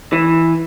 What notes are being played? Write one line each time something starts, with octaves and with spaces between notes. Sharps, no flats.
E3